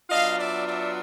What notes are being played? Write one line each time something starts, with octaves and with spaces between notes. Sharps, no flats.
F#3 B3 D4 F4 D#5 F5
D5 E5
D5 E5